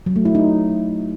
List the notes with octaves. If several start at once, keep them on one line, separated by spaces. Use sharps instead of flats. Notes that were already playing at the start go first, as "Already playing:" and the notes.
F#3
A3
E4
D#4